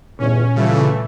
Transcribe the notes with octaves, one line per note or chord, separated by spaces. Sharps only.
G1 E2 A#2 C#4
C#3 E3 G3 A3 F4